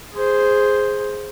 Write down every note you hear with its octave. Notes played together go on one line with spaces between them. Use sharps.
G#4 C5